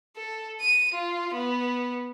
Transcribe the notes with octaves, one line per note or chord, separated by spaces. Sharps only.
A4
D#7
F4
B3